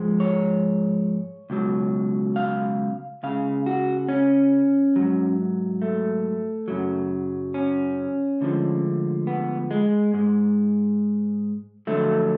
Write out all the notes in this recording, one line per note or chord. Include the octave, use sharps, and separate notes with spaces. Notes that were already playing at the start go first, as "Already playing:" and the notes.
Already playing: G#2 F3 G#3
C#5
C#2 B2 F#3
F5
C#2 C#3 G#3 F5
F#4
C#4
G#2 F#3
A3
F#2 C#3 F#3
C#4
D2 D3 F3 G#3
B3
G#3
G#2 G#3
F2 D3 F#3 A3